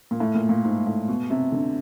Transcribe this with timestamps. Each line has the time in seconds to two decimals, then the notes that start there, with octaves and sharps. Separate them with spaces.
0.11 A#2
0.20 A2
0.35 A#2
0.49 A#2
0.65 G#2
0.87 A2
1.09 B2
1.30 C3
1.52 D3